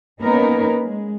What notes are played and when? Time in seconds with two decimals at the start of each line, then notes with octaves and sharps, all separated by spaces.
0.21 A#3 B3 C#4 D#4 A#4 B4
0.82 G#3